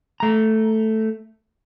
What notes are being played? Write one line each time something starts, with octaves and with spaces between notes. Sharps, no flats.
A3 A#5